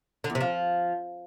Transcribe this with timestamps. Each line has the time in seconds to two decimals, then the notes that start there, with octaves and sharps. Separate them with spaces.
0.24 D3
0.30 E2
0.35 C3
0.41 F3